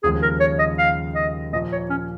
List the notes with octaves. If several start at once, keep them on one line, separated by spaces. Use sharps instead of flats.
D#2 C#3 F3 G#3 G#4
A#4
C#5
D#5
F5
D#5
A#2 F3 A#3 D#5
C#5
C#4